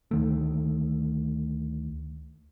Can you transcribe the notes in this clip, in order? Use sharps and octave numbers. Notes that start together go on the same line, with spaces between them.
D2 D#3 A3